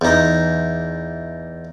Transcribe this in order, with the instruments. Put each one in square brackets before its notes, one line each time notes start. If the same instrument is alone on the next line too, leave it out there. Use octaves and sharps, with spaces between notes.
[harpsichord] E2 D#4